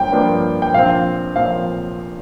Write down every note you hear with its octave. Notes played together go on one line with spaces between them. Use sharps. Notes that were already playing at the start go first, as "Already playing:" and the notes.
Already playing: G2 F3 A#3 G5
G2 F3 A#3 D4
G5
A#1 A#2 F3 C4 F5
A#2 F3 C4 F5